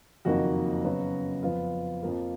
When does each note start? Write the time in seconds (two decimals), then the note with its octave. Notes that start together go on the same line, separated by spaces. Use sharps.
0.25 F#1 F2 D#3 A#3 F#4
0.84 F#2 C#3 F#3 B3
1.43 F2 F3 B3 F4
2.03 F2 F3 A#3